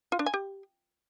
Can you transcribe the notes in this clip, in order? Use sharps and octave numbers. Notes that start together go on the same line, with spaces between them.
F4
D4
G#5
G4